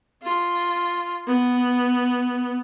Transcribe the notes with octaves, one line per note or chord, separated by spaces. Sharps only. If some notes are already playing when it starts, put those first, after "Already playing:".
F4
B3